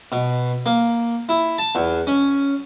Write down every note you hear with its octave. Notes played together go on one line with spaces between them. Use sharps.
B2
A#3
E4
A5
E2
C#4